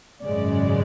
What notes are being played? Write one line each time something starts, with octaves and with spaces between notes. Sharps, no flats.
G#1 F#2 C#3 G#3 D5